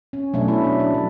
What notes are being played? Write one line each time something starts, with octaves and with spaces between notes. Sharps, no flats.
C#4
B2 F#3 A3 D4
E4
D4
D4
F#3